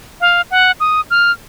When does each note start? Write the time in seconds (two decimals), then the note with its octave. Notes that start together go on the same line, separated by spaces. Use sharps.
0.21 F5
0.51 F#5
0.80 D#6
1.10 F6